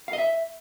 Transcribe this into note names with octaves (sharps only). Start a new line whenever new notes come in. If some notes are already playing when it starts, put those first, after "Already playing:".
F5
D#5
E5